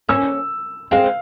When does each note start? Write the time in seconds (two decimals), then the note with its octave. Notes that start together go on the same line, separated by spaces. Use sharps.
0.09 A#3 C#4 E6
0.91 G#3 C4 F5